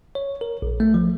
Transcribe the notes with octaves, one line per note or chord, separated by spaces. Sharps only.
C#5
A#4
A#1
A3
F3